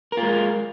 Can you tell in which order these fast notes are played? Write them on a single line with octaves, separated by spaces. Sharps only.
A#4 F4 G#3